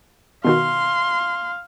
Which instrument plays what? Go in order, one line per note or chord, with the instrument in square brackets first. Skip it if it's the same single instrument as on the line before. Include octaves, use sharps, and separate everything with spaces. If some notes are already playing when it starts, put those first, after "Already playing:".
[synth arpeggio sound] B2 D#3 F#4 [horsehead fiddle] F5 [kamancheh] C6